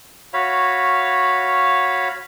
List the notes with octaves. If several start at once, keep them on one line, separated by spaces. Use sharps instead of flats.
F#4 C#5 F5 B5